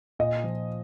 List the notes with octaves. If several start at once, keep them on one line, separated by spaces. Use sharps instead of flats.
A#2 D#5
F3